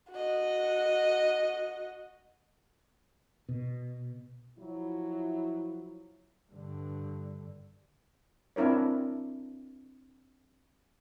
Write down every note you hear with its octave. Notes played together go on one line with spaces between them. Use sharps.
F#4 D#5
B2
F3 F#3 E4
G2 D3
C4 D4 E4 A#4 C#5